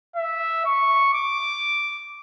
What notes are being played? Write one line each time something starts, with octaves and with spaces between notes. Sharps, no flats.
E5
C#6
D6